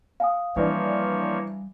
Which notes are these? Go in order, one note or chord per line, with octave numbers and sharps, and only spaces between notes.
F5 G#5 D#6
E3 F3 G3 A#3 D4 C#5